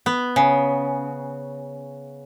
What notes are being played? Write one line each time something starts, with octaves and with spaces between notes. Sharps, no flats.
B3
C#3